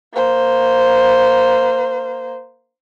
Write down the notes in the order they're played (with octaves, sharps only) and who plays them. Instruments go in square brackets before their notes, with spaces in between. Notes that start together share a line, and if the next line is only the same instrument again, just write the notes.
[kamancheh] A#3 C5